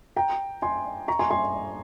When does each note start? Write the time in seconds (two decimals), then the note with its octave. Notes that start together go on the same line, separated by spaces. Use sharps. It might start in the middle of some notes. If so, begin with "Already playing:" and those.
0.16 G5 A#5
0.62 G#5 C6
1.08 A#5 C#6
1.19 G#5 C6
1.31 G#5 C6